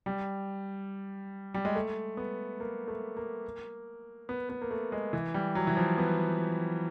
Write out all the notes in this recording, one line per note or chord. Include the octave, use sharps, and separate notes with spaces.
G3
G3
G#3
A3
B3
A#3
A3
A#3
B3
B3
A#3
A3
G#3
E3
G3
F#3
E3
F3
B3